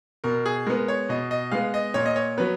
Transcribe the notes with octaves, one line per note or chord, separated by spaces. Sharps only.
B2 A#4
G#4
G#3 B3 A#4
C#5
B2 D#5
D#5
G#3 B3 F5
D#5
A#2 C#5
D#5
C#5
F#3 B3 B4